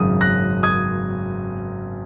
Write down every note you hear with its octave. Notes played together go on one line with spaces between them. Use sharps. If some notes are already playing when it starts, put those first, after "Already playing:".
Already playing: G#1 F#2 C#3 F#3 D#6
F#6 A#6
D#6 G#6